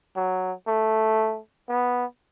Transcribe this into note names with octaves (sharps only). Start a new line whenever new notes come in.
F#3
A3
B3